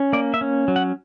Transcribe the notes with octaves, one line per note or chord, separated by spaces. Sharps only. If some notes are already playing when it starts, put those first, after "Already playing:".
Already playing: C#4
A#3 D5
E5
C#4
F#3
F#5